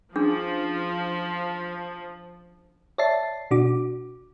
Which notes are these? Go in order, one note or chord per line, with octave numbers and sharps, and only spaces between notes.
F3 C#4 D4 G#4
C#5 D5 E5 A5 A6 C7
B2 D4 F#4 D6